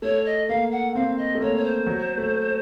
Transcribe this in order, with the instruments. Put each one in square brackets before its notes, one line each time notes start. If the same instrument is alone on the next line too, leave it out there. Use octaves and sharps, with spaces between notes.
[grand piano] A3 [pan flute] C#5
[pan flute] D#5
[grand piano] A#3 [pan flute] F5
[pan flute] F#5
[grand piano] C4 [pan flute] F5
[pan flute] D#5
[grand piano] A3
[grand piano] A#3 [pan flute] C#5
[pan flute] C#5
C5
[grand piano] F#3
A3